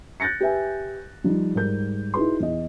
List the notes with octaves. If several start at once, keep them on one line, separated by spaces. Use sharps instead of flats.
F#6 G6 A6 A#6 C#7
G4 B4 E5 G#5
F3 G3 D#4 F4
G#2 G3 A#4 G6
D#4 E4 F#4 G#4 B4 C6
E2 E4 D#5